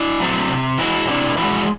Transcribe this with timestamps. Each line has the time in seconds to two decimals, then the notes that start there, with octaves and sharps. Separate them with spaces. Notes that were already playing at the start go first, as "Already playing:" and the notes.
Already playing: D4 E4
0.20 F#3 A3 C4
0.49 C3
0.78 E3 G#3 E4 F#4
1.08 C3 D4 E4
1.38 E3 G#3 E4 F#4